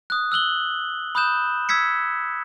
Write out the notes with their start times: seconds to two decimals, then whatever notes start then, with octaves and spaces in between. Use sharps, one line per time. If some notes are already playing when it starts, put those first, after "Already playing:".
0.10 D#6 F#6
0.32 E6 F#6 F#7 G7
1.15 B5 D#6 F#6 G6 E7
1.69 E6 G#6 B6 C#7